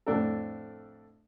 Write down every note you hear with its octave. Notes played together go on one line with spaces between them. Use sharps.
F2 A2 D4 A4